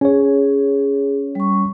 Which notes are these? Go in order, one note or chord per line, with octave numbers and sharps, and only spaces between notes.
C#4 G#4 C#5
G3 C#6